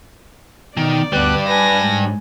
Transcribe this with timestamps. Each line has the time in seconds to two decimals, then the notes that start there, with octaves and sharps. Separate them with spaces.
0.77 B2 D#3 D5
1.13 D2 G3 B3 D4 F#6
1.47 B4 G#5 A#6
1.83 G#2